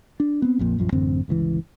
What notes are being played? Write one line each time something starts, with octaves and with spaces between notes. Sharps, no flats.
D4
B3 C4
A#1 F2 A#2
A#1 F#2 F3
A1 F#2 D3 C4
G1 C#2 D3 E3